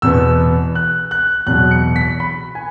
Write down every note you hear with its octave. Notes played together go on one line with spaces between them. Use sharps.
E2 B2 B3 E6
F#6
F#6
E2 B2 F#3 F#6
C#7
B6
B5
G#5